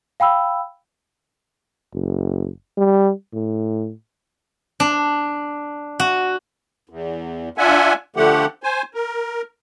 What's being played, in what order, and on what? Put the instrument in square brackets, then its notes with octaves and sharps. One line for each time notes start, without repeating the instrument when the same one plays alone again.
[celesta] F5 G5 B5 E6
[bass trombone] F#1
G3
A2
[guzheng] D4
F#4
[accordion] E2
D4 F4 E5 F#5 G#5
D3 F3 A3 G4 F#5
C5 G#5
A#4